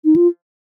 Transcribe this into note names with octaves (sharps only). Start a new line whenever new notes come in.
D#4
F4